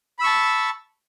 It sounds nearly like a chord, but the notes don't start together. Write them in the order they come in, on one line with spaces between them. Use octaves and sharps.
B5 E6 C#6 A5